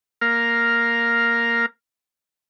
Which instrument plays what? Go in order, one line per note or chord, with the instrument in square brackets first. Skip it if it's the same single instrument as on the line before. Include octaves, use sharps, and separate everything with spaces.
[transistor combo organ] A#3 A#4 F5